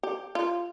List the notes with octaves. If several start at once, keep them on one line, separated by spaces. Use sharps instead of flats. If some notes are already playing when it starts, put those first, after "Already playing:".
G4
F4